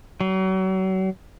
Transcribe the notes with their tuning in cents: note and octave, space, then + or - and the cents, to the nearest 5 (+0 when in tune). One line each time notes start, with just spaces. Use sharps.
F#3 +35